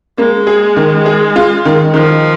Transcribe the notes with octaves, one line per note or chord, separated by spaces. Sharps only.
G#3 A#3
G#4
D#3
G#4
F4
D#3
D#3 F3